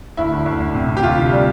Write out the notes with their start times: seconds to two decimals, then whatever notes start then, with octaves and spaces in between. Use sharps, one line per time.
0.17 D2 E4
0.32 D2
0.46 D2
0.60 D2
0.74 C3
0.89 C3
0.97 G4
1.03 D2 F4
1.17 C3
1.32 G3